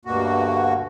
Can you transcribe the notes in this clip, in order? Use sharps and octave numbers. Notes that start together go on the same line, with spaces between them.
D2 G2 B2 A#3 F#4